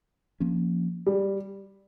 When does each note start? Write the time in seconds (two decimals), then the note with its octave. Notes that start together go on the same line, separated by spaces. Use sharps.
0.40 F3 A#3 C#4
1.06 G3